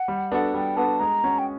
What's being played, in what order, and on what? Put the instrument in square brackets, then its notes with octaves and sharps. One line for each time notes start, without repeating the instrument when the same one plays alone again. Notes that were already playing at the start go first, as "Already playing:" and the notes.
Already playing: [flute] F#5
[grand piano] G3
B3 D4 F#4 A4
[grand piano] G3 [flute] G5
[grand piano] B3 D4 F#4 A4 [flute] A5
[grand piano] G#3 [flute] A#5
[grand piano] C#4 F#4
[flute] G5